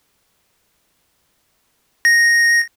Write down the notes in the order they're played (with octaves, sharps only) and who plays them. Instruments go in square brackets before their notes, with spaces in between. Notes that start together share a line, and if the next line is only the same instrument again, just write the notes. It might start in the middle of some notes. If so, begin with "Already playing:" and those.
[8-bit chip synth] A#6